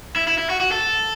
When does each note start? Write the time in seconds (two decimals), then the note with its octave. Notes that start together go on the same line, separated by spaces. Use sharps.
0.16 E4
0.27 E4
0.38 E4
0.50 F#4
0.60 F#4
0.72 A4